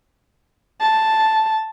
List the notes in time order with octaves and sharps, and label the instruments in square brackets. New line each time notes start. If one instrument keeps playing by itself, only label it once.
[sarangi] A5